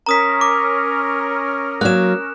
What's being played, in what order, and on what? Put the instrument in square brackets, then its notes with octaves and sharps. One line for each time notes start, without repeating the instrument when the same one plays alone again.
[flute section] C#4 A#4 [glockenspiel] A#5 D#6 B6
[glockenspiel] D6
[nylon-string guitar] F#3 A#3 [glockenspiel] F#6 E7